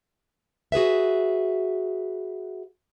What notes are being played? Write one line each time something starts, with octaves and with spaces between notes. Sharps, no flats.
F#4 G#4 B4 E5